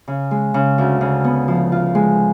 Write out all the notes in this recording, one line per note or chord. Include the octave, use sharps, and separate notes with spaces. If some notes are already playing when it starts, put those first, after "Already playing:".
C#3
G#3
C#3
D2
C#3
B3
F3
F4
G#3